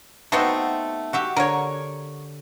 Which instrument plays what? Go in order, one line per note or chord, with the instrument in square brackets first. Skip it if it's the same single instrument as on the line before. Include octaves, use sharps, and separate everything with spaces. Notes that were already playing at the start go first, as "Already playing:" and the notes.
[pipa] A3 B3 C4 [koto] D#4 F#4 C5
[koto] F#4 G4 E5
[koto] D3 [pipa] A#4 C#5